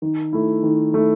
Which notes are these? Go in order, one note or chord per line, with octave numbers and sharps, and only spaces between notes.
D#3
A3 E4
D#3
A3 E4